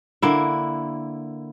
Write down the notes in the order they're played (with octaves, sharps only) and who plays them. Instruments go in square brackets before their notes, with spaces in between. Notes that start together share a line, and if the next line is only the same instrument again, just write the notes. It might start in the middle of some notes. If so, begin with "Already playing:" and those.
[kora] D3 A#3 E4